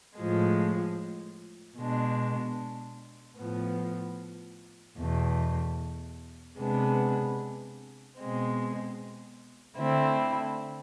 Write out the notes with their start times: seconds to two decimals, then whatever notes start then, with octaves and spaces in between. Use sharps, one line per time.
0.18 A2 F3 G#3
1.78 B2 G#3 D4
3.38 A2 F3 B3
4.98 E2 B2 A3
6.58 C3 G#3 B3 D4
8.18 B2 G#3 C4
9.78 D3 A3 C4 E4